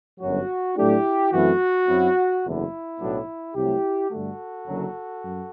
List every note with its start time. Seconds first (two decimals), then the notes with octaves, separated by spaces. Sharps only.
0.20 G1 F#2 F#3 F#4
0.77 A2 F#3 A3 D4 E4 G4
1.33 F#2 E3 A3 C4 E4 F#4
1.88 F#2 F#3 C4 E4
2.43 F#1 E2 D3 E4
2.99 B1 A2 F#3 B3 D4
3.55 C2 C3 F#3 A3 E4 G4
4.10 G2 D3 A3 F#4 A4
4.67 F#1 F#2 D3 F#3
5.22 F#2